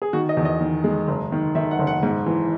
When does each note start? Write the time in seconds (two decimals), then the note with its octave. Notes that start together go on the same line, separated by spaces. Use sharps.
0.02 G#4
0.13 D#3 F#4
0.29 D#5
0.37 E2
0.45 D#5
0.61 D#3
0.84 G#3
1.08 F#1
1.32 D#3
1.55 D#3 E5
1.71 F#5
1.79 F#1
1.87 F#5
2.03 G#2
2.26 E3